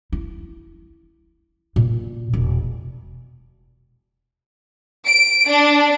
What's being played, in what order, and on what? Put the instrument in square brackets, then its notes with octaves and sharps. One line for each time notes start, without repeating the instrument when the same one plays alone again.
[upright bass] E4
A#2
E1
[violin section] D7
D4